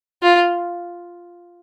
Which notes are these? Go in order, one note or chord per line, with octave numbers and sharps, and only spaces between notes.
F4